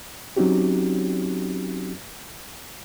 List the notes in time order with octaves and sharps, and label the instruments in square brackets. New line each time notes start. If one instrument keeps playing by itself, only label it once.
[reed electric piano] F#3 C4 C#4 D#4 F#4 G4